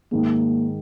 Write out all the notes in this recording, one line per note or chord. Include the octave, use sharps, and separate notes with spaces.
G#2 D#3 G#3 A#3